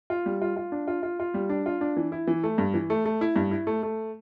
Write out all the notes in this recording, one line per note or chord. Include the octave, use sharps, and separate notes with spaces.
F4
G3
F4
F4
D4
F4
F4
F4
G3
D4
F4
D4
E3
E4
E3
A3
G2
E3
A3
A3
E4
G2
E4
A3
A3